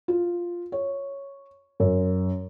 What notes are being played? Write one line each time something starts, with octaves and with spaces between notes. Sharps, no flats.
F4
C#5
F#2